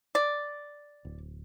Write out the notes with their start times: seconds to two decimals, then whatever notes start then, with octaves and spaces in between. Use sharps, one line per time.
0.15 D5
1.05 D1